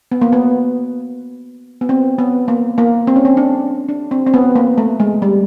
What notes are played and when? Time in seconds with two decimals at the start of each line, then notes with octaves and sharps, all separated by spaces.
0.12 B3
0.22 A#3
0.33 B3
1.81 B3
1.89 C4
2.19 B3
2.48 A#3
2.78 A#3
3.07 C4
3.16 C#4
3.25 C4
3.37 D4
3.89 D4
4.11 C4
4.27 C4
4.34 B3
4.55 A#3
4.78 A3
5.00 G#3
5.22 G3